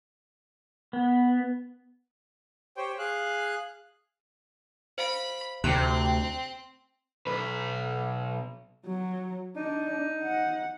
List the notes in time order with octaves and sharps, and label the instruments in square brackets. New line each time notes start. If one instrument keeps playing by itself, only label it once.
[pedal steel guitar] B3
[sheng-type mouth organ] G4 C5 C#5 G5
G#4 F5 F#6
[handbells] C5 F5 D7 [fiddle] B5
[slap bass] D2 [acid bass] C3 [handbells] A3 C6 F#6 [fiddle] C4
[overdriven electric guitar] B1 B4
[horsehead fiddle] F#3
[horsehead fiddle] D4 [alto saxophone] D#4
[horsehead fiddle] F#5